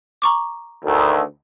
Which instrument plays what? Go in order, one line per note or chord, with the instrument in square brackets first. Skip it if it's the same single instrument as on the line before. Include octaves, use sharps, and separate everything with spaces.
[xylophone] A#5 C#6 D6
[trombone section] D2 D#3